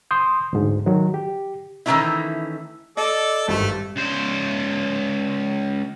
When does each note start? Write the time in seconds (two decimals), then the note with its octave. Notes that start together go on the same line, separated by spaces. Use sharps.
0.11 C6 D#6 G6
0.53 D2 G#2
0.86 D#3 F#3
1.14 G4
1.86 D#3 E3 F#3 A3 C#4 E4
2.97 A4 D5 D#5
3.48 G#1 G2 A3
3.96 C#2 C5